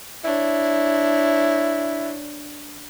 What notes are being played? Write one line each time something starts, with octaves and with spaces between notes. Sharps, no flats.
D4 E4 C#5